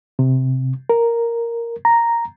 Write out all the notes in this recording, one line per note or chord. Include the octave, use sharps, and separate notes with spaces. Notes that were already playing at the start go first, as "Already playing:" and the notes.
C3
A#4
A#5